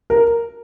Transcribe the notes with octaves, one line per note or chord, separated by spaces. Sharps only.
A#4